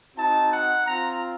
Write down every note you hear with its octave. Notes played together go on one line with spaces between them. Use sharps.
C4 D#4 F#4 A5
F#5
C4 F4 A#5